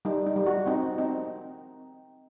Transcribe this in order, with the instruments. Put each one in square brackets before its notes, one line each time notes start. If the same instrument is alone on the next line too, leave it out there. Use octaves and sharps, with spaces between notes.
[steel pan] G3 D#4
D#4
G3
F#4
C4 D#4
C4 D#4